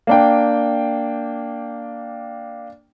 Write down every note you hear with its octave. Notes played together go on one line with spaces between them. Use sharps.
A#3 D4 G5